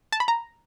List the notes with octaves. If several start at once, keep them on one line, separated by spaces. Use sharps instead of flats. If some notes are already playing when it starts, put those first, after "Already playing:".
A5
B5
A#5